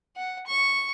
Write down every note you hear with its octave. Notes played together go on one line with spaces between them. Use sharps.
F#5
C#6